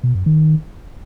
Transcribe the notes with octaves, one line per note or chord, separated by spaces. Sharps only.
B2
F#2
D#3